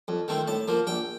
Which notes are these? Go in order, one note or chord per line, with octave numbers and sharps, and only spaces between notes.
F2
D#3 A3 C4
A2 A5
F3 A#3
A#1 G5